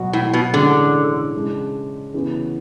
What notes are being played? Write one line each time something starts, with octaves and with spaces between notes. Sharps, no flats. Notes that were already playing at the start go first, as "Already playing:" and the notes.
Already playing: B2 F#3 B3 F#4
A2
B2
A2 D3 E3 G#3 C#4 G#4
C#3 G#3 D4
C#3 E3 B3 F#4